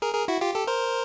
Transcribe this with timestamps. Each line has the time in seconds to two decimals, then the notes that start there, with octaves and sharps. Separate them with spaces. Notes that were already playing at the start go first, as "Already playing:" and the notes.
0.02 G#4 A#4
0.14 G#4 A#4
0.28 E4 F#4
0.41 F4 G4
0.54 G4 A4
0.67 A#4 C5